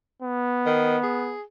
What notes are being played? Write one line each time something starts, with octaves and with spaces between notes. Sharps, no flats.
B3
D#3
G#4